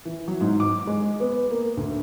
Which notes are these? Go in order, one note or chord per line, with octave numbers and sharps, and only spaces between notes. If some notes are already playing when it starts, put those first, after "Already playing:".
E3
F#3
G#2
D6
G#3
B3
A#3
D2